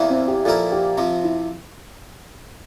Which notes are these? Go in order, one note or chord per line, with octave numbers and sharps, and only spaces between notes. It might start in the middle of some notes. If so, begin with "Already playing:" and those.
Already playing: E2 C3 E3 A#3 E4
C4
G4
A#2 F3 A#3 E4 A4 A#4
G4
C3 F3 C4 F4
E4